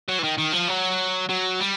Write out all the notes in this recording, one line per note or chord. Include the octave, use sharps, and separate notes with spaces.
F#3
E3
D#3
D#3
F3
F#3
F#3
G3